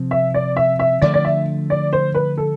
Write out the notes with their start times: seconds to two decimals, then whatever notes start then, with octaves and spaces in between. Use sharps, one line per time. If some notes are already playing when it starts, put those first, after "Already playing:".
Already playing: C3 F3 C4
0.11 E5
0.34 D5
0.56 E5
0.79 E5
1.02 D3 F3 A3 D5
1.14 D5
1.25 E5
1.70 D5
1.93 C5
2.15 B4
2.38 A4